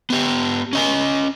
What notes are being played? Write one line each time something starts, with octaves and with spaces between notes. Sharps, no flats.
B3 G4
C#4 D#5 G#5